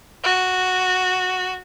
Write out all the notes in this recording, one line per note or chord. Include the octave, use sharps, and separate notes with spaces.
F#4